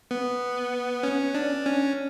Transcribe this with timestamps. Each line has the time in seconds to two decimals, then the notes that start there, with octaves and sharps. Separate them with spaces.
0.11 B3
1.03 C#4
1.34 D4
1.66 C#4